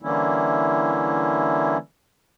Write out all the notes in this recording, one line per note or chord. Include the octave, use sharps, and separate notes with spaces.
D3 E3 G3 A#3 C#4 E4